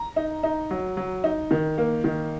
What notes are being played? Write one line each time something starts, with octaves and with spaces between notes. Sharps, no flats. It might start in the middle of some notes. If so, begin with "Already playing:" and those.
Already playing: A#5
D#4
D#4
F#3
F#3
D#4
D#3
A#3
D#3